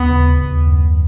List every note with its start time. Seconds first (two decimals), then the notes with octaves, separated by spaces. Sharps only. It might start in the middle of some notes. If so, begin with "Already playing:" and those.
Already playing: D#2 B3
0.10 C#3
0.38 D#2
0.67 F#2